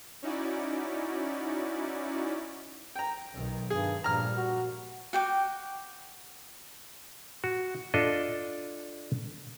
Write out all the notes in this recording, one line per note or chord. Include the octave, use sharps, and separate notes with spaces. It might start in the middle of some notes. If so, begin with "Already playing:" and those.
C#4 D#4 E4 F#4 D5
G5 A#5
B1 D#3
G2 G#4
G2 A#2 F3 G3 A#5 F6
F#4
F#4 G5 D6
F#4
D4 F4 A4 D#5